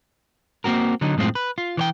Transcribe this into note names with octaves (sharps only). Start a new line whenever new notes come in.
A#3 C4 F#4 A#4
D3 F#3 D#4
F#2 A2 G#3 C4 F4
B4
F4
E3 C#5 G5